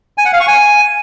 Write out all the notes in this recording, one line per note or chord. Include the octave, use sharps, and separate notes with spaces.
G#5
F#5
F5
C#6
G#5